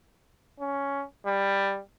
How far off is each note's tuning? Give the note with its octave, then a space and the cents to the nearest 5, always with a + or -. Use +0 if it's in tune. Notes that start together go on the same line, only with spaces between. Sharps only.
C#4 +10
G3 +10